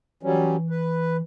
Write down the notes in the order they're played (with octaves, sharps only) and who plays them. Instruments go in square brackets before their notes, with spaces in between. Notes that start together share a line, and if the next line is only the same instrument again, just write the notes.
[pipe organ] E3 [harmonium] F#3 G3 C#4
[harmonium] B4